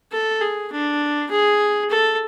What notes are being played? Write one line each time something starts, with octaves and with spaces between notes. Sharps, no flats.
A4
G#4
D4
G#4
A4